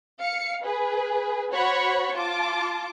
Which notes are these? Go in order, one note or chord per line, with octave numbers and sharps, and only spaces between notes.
F5 C#7
G#4 B4
F#4 C5 C#5 F#5 B5 C#6
F4 A5 D6